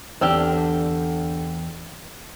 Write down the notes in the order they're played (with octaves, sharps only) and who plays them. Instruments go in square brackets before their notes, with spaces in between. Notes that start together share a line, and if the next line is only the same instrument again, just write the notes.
[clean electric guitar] E2 [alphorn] D3 [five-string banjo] C4 D4 G4 [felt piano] G5 E6 F6